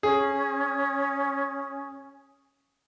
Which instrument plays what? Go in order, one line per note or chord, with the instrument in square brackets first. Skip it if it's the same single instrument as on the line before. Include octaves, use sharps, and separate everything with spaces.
[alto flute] C#4 [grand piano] G#4